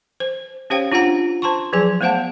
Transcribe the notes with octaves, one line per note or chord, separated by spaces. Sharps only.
C5
C#4 G4 C5 C#5 F5 G5
D4 F4 C5 F#5 A#5
C5 A5 A#5 C6 C#6
F3 F#3 G#4 G#5
A3 B3 C5 F5 F#5 A5